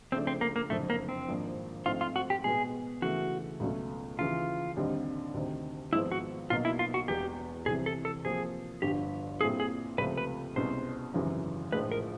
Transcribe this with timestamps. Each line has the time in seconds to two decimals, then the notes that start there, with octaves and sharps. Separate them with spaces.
0.12 C#3 F3 A3 C4 D4
0.27 C4
0.41 A#3
0.56 A#3
0.70 F#1 F2 D3 A3
0.90 A#3
1.09 C4
1.29 G#1 G#2 F3 A#3 D4
1.86 G#2 F3 A3 C4 D#4 F4
2.01 F4
2.16 F#4
2.30 G4
2.44 B2 G#3 B3 G#4
3.02 C#3 E3 A3 F#4
3.60 C#2 B2 F#3 A3 C#4
4.19 D#2 C#3 E3 F4
4.76 D#2 D3 G3 C4 D#4
5.34 D2 C3 D#3
5.93 G#1 G#2 F3 G#3 B3 E4
6.12 F#4
6.50 B1 B2 F#3 A#3 D#4 F4
6.65 E4
6.79 F4
6.94 F#4
7.08 E1 E2 B2 G4
7.66 C2 C3 E3 G#4
7.86 A4
8.05 A4
8.24 C3 F3 A#3 G#4
8.82 G1 G2 D3 F3 G4
9.40 A#2 G3 C4 E4 G#4 A4
9.60 G#4
9.98 C#2 C3 F3 A3 B4
10.18 B4
10.56 C2 B2 G#3 C#4 C5
11.14 G#1 F#2 C#3 E3 G3
11.72 A#1 A2 F3 G#3 B4
11.92 A#4